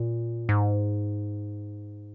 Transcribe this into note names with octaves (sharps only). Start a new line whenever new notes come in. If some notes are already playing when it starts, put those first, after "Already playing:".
Already playing: A#2
G#2